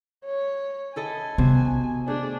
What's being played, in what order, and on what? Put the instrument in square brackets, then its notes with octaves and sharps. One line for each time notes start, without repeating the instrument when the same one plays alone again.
[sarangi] C#5
[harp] E4 A4 D#5 [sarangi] G#5
[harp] C3 F#4 C6 [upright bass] B3
[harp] A3 G#4 [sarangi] D4